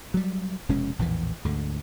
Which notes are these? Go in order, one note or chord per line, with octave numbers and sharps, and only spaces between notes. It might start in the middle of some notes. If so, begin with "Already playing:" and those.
F#3 G3
F1 B2 G#3 C#4
A#1 E2 A2 E3
D2 G#2 D3